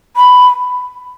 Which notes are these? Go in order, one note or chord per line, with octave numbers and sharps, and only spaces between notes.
B5